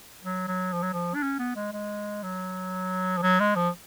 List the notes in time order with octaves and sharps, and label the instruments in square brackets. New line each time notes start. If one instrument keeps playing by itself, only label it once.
[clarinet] F#3
F#3
F3
F#3
F3
D4
C#4
B3
G#3
G#3
F#3
F3
F#3
G#3
F3